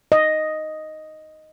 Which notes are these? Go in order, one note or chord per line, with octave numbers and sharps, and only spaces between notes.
D#5